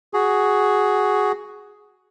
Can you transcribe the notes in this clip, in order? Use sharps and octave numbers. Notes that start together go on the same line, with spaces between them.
F#4 G#4